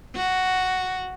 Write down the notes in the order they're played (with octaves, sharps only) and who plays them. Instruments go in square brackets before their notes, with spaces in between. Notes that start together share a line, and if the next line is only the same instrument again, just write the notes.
[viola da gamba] F#4